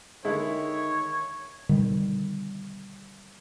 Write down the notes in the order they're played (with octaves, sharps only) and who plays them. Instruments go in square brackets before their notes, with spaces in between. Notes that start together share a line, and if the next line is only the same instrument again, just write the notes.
[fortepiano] D3 G#3 E4 [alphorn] D#3 [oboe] C#5
[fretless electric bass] B2 D3 D#3 G3